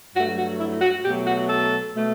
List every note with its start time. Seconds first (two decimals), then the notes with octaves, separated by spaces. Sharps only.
0.15 G2 F#3 A3 F#4
0.38 F#4
0.59 E4
0.82 F#4
1.04 B2 F#3 A3 G4
1.26 F#4
1.49 A4
1.94 B2 A3